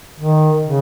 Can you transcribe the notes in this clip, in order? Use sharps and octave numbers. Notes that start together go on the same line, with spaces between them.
D#3
C#3